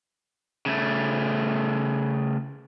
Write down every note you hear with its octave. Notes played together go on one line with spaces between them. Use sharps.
C#3 A3